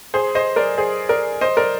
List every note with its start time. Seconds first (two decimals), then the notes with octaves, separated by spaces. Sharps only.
0.14 G#4 C5
0.35 C5 D#5
0.56 A#4 D5
0.78 G#4 C5
1.09 A#4 D5
1.41 C5 D#5
1.57 A#4 D5